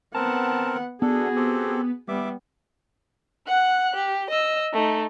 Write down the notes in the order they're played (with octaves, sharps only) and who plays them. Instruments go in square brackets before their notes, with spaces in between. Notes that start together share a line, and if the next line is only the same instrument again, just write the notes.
[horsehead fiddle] B3 F#5 [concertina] C4 A#4 [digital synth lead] A5
[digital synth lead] B3 [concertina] D4 A4 [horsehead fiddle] F#4 G#4
[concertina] C4 G4 A4
[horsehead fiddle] G3 B3 [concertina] E5 D6
[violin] F#5 F#6
G4
D#5 E6
A3 D#4